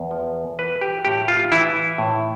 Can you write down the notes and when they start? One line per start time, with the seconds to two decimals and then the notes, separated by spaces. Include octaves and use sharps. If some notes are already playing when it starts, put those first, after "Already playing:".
Already playing: E2
0.11 F3
0.59 E3 B4
0.81 G4
1.05 A2 G4
1.28 F4
1.52 E3 E4
1.98 A2